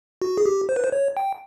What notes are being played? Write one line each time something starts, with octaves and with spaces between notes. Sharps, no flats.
F#4
G#4
G4
C5
B4
C5
C#5
G5